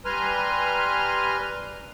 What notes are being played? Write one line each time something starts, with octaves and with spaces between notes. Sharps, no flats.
G3 B4 G#5 A#5 C6 F6